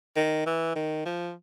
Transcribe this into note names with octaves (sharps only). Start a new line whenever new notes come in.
D#3
E3
D#3
F3